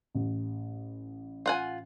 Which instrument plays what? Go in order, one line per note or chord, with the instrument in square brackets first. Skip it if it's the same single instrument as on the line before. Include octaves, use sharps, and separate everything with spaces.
[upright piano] A1
[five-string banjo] F4 F#5 G#5